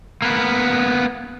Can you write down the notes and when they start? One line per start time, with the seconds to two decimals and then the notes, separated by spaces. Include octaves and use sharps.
0.22 A#3 B3